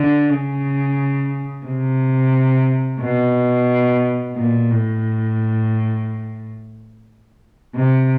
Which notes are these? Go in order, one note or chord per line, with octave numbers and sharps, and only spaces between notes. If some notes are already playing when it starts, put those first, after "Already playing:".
Already playing: D3
C#3
C3
B2
A#2
A2
C3